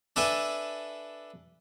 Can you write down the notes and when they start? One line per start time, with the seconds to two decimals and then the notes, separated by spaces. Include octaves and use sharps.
0.16 D4 A4 B4 E5 G#5